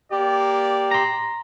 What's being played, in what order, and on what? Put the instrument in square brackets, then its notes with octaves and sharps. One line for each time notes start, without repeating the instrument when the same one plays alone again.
[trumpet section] A#3 D5 [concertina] G4
[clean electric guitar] A#5 C6